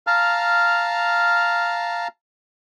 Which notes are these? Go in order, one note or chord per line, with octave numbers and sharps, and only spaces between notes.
F5 A5 A#5 F6